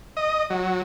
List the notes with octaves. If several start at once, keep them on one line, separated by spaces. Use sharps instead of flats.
D#5
F#3